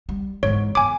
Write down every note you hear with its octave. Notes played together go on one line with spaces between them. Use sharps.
G3
G#2 E3 C#5
E2 G#5 D6